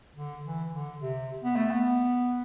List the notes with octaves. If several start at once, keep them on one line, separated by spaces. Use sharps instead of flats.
D3
E3
D3
C3
B3
A3
B3